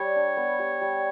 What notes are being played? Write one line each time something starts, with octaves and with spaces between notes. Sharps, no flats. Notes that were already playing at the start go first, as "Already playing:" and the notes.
Already playing: G3 G4 C#5
D4
B3
G4
G3